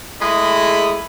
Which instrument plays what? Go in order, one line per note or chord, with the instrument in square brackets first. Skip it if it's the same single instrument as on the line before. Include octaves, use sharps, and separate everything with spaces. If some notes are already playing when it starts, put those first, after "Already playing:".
[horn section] G#3 A3 E4 G#4 D#5 B5